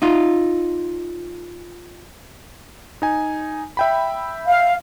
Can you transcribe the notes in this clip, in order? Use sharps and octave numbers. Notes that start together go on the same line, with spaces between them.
D#4 F4
D#4 G#5
E5 G5 B5
F5